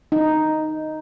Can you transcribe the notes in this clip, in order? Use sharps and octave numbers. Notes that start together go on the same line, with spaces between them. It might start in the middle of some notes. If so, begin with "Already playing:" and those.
D#4